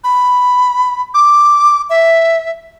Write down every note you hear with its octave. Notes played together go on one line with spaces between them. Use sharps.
B5
D6
E5